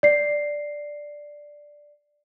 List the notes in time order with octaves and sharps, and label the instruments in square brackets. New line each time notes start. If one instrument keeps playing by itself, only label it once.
[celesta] D5 C7